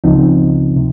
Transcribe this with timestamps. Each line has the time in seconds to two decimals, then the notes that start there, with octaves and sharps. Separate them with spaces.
0.04 C#2 C#3 F3 C4 D#4
0.76 C3